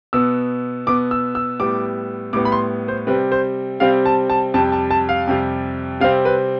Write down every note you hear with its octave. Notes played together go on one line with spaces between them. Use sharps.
B2 B3 E6
B2 B3 D6
E6
E6
A2 G3 B3 D6
A2 G3 B3 D6
B5
C6
C5
C3 G3 C4 B4
C5
C3 G3 C4 F5
A5
A5
F2 C3 G3 A5
A5
A5
F5
F2 C3 G3
C3 G3 C4 F5
B4